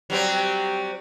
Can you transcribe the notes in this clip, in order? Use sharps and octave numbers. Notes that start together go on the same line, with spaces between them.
F#3 G3 C4